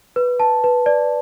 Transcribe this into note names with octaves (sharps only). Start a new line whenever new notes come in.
B4
A5
B4
D5